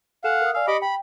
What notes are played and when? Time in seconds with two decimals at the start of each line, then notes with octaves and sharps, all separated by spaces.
0.24 A4 F5 F#5 G#5 E7
0.41 A#4 D#6
0.54 D5 F5 G#5 E6
0.68 G4 D#5 B5 D6 C#7
0.82 G5 B5